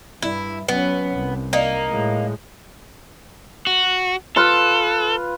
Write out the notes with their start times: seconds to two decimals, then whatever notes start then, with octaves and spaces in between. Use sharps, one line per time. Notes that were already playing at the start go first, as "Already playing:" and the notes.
0.22 G2 E4
0.68 F#3 B3 C#4
1.12 C2
1.53 A#3 D#4
1.90 A2 G#3
3.67 F#4
4.36 F4 A4 B4 F5